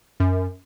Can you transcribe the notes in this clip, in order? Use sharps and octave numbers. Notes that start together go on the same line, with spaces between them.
F#2